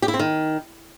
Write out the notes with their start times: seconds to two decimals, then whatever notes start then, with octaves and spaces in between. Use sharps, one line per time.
0.02 G4
0.08 E4
0.14 C4
0.19 D#3